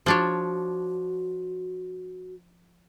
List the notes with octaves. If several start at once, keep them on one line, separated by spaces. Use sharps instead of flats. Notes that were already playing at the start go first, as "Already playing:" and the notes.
F3 D4 F#4 C#5